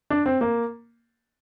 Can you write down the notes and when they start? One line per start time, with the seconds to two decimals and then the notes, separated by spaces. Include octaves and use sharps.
0.10 D4
0.26 C4
0.41 A#3